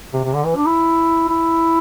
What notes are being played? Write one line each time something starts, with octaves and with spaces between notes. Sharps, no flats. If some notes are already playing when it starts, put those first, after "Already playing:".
C3
C3
D3
E3
D4
E4
E4